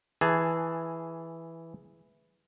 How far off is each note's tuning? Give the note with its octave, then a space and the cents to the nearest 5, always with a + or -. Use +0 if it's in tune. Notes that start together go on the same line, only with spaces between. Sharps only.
E3 +0 G#4 +0 A5 +5